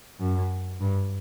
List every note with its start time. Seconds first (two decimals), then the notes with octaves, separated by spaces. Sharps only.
0.20 F#2
0.80 G2